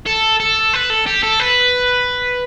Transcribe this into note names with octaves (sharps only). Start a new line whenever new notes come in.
A4
A4
B4
A4
G4
A4
B4